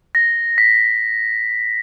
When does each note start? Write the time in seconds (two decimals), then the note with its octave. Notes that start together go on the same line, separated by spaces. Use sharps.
0.15 A#6
0.58 B6